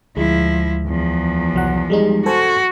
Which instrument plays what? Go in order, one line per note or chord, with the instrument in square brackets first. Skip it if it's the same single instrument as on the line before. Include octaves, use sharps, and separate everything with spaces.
[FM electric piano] D2 G#3 [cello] F3 E4
[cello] E2 F3
[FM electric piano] C2 F#3 F#5
G3 G#3 D#4
[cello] F#4 [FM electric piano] A4 C5 G#5